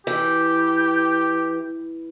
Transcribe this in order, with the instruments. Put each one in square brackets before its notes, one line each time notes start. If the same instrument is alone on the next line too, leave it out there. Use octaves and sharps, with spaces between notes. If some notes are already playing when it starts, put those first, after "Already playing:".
[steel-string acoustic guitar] E3 [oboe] G4